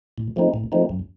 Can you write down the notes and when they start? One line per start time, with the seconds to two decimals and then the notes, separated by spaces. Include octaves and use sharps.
0.18 A2
0.36 F3 A3 C4 D#4
0.54 A2
0.72 F3 A3 C4 D#4
0.89 F#2